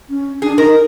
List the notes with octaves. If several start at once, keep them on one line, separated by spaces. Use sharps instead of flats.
C#4
D4 G#4
D#4 A#4